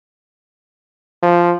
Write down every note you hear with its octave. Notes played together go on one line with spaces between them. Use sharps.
F3